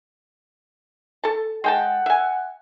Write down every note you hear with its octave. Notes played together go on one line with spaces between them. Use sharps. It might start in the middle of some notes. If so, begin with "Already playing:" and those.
A4 A5
G#3 F#5 G5 A5
E5 G#5